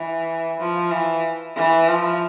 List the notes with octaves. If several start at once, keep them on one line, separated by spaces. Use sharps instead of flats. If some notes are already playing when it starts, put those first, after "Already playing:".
Already playing: E3
F3
E3
E3
F3